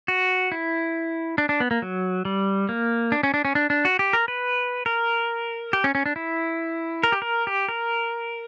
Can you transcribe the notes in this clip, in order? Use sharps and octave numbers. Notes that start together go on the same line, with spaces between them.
F#4
E4
D4
D4
B3
A#3
F#3
G3
A#3
D4
C#4
D4
C#4
D4
D4
F#4
G4
A#4
B4
A#4
G4
C#4
C#4
D4
E4
A#4
G4
A#4
G4
A#4